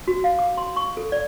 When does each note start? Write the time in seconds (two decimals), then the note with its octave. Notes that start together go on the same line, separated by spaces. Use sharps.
0.08 F#4
0.24 F5
0.39 D6
0.58 C6
0.76 C#6
0.97 A4
1.12 D5